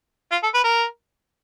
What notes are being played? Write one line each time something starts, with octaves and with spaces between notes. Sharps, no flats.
F4
A4
B4
A#4